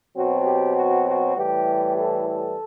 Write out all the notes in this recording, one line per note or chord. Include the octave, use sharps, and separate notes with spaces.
B2 F#3 C4 F#4
G4
F#4
F#4
A2 E3 G3 G4
A4
A4